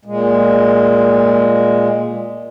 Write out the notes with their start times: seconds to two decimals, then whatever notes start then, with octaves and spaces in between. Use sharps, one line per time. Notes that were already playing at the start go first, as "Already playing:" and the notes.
0.05 A#2 G#3